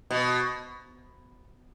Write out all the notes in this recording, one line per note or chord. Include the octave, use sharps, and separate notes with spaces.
B2